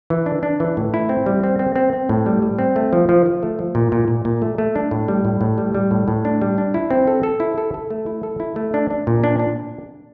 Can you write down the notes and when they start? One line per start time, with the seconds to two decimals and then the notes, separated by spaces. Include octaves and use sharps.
0.10 E3
0.26 D4
0.43 D4
0.60 E3
0.77 A2
0.94 E4
1.09 C4
1.26 G3
1.44 C4
1.59 C4
1.76 C4
1.93 C4
2.09 A2
2.26 G3
2.42 G3
2.59 C4
2.76 A3
2.93 F3
3.09 F3
3.26 F3
3.43 A3
3.59 F3
3.75 A#2
3.92 A#2
4.08 A#2
4.25 A#2
4.42 A3
4.58 A3
4.76 D4
4.91 A2
5.08 G3
5.25 A2
5.41 A2
5.58 G3
5.74 G3
5.91 A2
6.08 A2
6.25 D4
6.42 G3
6.58 D4
6.74 E4
6.91 C4
7.07 A4
7.23 A4
7.40 E4
7.58 A4
7.74 A4
7.90 A3
8.06 E4
8.23 A4
8.40 E4
8.56 A3
8.74 D4
8.91 D4
9.07 A#2
9.24 D4
9.39 D4